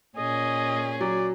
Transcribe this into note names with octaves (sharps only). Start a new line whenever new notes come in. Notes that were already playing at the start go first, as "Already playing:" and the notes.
A#2 C#4 G#4 D#5
F#3 D5